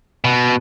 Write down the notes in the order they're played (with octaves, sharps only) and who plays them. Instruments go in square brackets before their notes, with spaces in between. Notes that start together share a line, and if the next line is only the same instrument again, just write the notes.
[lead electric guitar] B2